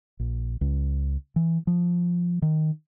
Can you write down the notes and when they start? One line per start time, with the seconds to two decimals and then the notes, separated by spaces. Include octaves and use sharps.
0.20 A#1
0.61 C#2
1.36 E3
1.67 F3
2.42 D#3